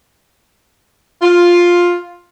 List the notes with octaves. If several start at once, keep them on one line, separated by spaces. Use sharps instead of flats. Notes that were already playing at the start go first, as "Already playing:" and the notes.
F4